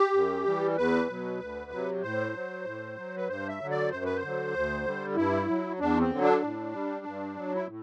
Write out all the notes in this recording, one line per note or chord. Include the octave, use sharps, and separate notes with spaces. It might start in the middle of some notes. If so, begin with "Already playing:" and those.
Already playing: G4
F#2
E3 G3
E2 B4
B2 F#3
D2
C3 F#3
A2 C5
F#3
A2
F#3
B4
G2 C5
E5
D3 F#3
D5
F#2 C5
B4
C5
D3 F#3
D2
D3 G3
G2 E4
F#3
E2 D4
C4
D3 F#3
D4
A2
G3
G2
F#3
E4
A2